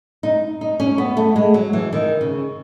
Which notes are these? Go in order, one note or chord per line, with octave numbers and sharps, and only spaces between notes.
D#4
D#4
C#4
B3
A3
G#3
F#3
E3
D#3
C#3